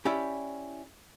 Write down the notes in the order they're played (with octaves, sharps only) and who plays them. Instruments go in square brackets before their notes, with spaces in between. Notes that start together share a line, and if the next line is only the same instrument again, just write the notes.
[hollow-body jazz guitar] C#4 E4 G4 D5 E5